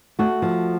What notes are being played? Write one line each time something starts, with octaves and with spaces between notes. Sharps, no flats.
A3 F#4
F3